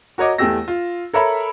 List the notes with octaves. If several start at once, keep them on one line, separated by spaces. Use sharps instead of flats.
F#4 A#4 C#5 D#5 D6
E2 A3 G4 E6 A#6
F4
A4 A#4 C#5 E5 B5